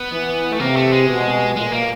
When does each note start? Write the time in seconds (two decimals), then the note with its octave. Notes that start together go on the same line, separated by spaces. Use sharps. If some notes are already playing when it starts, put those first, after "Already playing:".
Already playing: B3
0.12 E3
0.52 A3
0.60 C3 A#3
0.76 A3
0.93 G#3
1.09 B2
1.57 A#2 G#3
1.73 A#3